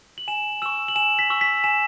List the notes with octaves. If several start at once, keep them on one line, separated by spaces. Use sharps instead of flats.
F#7
G#5 E7
C#6 E6 E7
F#7
G#5 E7
B6
C#6 E6
B6
G#5 E7